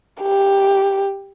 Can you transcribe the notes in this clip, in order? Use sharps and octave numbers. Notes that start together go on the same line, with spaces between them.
G4